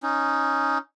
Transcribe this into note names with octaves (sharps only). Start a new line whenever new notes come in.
C#4 D#4